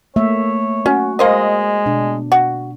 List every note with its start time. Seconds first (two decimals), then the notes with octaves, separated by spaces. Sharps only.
0.16 A3 A#3 C#5 E5
0.86 C#4 F#4
1.19 G#3 A#3 C5 D#5
1.86 B2 D4
2.32 F#4